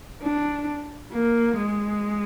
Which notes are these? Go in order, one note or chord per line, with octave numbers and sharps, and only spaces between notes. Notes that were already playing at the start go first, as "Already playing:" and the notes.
D4
A#3
G#3